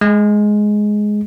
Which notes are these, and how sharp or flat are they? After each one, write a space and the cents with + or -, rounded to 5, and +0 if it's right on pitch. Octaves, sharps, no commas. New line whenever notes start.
G#3 +10